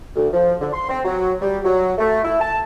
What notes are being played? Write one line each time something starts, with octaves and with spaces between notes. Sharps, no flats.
D2
F3
D3
C6
C4
F#3
G3
F#3
A3
E4
A5